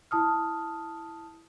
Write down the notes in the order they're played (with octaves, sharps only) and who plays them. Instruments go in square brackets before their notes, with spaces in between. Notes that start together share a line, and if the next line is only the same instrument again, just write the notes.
[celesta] E4 A5 D#6 F6